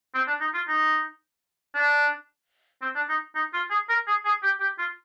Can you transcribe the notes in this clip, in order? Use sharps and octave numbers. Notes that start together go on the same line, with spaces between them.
C4
D4
D#4
F4
D#4
D4
C4
D4
D#4
D#4
F4
G#4
A#4
G#4
G#4
G4
G4
F4